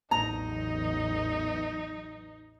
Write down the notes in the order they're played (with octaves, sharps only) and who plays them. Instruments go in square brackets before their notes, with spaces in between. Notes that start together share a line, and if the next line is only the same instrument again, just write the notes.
[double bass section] A1 E2 F#3 [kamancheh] D#4 [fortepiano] A#5